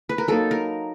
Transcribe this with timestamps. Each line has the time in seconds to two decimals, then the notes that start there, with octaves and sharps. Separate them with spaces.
0.09 B4
0.18 A#4
0.28 F#3 A#3 D#4 A4
0.51 A#4